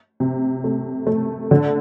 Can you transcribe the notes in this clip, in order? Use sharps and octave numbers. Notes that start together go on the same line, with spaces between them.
C3
A3
A3
D3